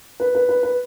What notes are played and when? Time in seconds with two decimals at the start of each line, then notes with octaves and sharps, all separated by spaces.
0.20 B4
0.35 B4
0.49 B4
0.63 B4